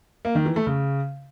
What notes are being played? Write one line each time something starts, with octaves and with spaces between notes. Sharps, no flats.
A#3
D#3
E3
A3
C#3